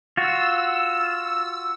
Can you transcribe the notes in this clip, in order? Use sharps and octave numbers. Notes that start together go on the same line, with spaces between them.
F4 F#4 E6